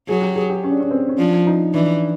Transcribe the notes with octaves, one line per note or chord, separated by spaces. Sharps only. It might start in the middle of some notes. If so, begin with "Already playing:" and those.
F#3 G#4
G4
G#4
G4
C#4
D4
C#4
C4
C#4
F3 D4
D#4
E3 D4